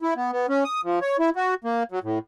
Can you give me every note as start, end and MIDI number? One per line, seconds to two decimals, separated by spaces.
0.02 0.14 64
0.16 0.32 59
0.33 0.46 59
0.49 0.64 61
0.64 0.81 87
0.84 0.99 53
1.02 1.17 73
1.19 1.30 64
1.36 1.54 66
1.64 1.83 58
1.92 1.99 54
2.04 2.19 45